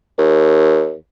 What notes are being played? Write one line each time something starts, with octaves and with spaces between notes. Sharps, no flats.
D#2